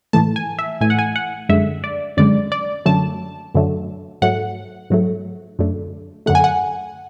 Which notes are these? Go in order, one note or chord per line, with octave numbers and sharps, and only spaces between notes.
A2 E3 A3 A5
G#5
E5
A2 E3 A3 G#5
F#5
G#5
F#5
F#2 D3 G#3 E5
D5
F#2 D3 G#3 D5
D5
F#2 D3 F#3 A3 A5
F#2 D3 F#3 A3
G#2 F#3 A3 F#5
G#2 F#3 A3
F#2 D3 A3
F#2 D3 A3 F#5
G#5
F#5